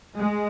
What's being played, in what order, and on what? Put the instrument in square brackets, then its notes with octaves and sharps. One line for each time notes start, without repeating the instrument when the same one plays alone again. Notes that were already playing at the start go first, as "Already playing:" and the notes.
[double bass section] G#3